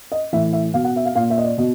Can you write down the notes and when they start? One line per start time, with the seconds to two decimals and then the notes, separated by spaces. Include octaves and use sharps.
0.12 D#5
0.33 A2 E3 E5
0.53 E5
0.74 B2 F5
0.84 F#5
0.96 E5
1.05 F5
1.15 A#2 F5
1.30 E5
1.38 D#5
1.44 D5
1.58 B2 D#5